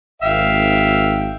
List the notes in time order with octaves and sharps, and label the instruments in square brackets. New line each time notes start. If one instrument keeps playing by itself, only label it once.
[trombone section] G#1 [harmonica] E5 F5 G5